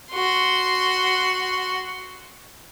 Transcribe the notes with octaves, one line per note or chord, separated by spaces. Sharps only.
F#4 C6